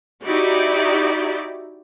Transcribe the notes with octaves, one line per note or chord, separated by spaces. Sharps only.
D#4 E4 F#4 G4 D5